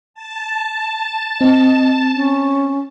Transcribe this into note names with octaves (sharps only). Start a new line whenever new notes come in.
A5
C4 D#5
C#4